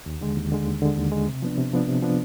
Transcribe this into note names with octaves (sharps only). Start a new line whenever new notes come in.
D#2
D3 G#3
D#2
D3 G#3
D#2
D3 G#3
D#2
D3 G#3
C3
F3 B3 D4
C3
F3 B3 D4
C3
F3 B3 D4